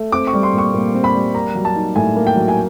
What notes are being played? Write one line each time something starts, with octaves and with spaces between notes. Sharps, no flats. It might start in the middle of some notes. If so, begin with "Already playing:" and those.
Already playing: A3
C4 D6
C#6
G3
C6
A#2
C#6
A#2
C4
B5
G3
A#3 A#5
F#3
A5
D#4
A2 G#5
A#3
G5
F#3
G#5